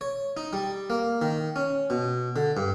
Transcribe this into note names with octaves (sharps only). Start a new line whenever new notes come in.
C#5
D#4
G3
A#3
D#3
C#4
B2
D3
G2